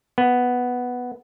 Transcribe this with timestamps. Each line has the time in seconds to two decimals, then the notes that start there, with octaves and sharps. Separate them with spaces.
0.18 B3